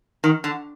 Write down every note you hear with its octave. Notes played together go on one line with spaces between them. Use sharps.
D#3
D3